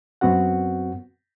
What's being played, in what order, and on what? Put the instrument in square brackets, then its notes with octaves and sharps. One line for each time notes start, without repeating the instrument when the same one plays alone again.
[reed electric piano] F#2 B3 C4 F#4 F#5